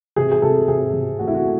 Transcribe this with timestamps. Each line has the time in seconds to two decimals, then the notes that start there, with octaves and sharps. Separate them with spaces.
0.16 C3 G#4
0.32 G#4
0.42 C3 A4
0.68 C3 G#4
0.93 C3
1.19 A3 F#4
1.28 E4
1.34 F#4
1.44 A3